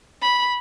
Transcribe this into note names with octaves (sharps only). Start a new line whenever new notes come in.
B5